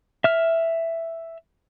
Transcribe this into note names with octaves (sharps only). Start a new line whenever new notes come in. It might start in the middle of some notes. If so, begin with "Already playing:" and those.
E5 F6